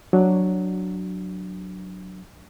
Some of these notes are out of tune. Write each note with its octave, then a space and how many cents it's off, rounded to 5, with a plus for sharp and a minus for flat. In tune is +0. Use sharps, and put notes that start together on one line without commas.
F#3 +0 D4 +0